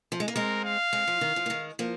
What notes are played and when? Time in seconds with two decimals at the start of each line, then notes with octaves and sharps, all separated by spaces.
0.12 F3
0.20 G#3
0.28 A#3
0.35 G#3 C4 A#4
0.65 F5
0.93 G#3 C4
1.07 F3
1.21 D#3
1.36 F3
1.46 A#3
1.50 D#3 G#3
1.79 F3 A#3